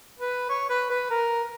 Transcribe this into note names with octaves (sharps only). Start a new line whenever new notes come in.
B4
C#5
B4
B4
A#4